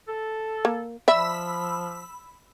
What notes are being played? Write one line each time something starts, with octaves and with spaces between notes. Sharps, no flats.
A4
A#3
F3 D5 E5 B5 E6